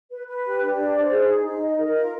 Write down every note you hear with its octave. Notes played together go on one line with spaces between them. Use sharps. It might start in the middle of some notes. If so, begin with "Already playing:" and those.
B4
B4
G4
D4
D5
C5
G#4
D#4
D#4
D#5
A#4
F4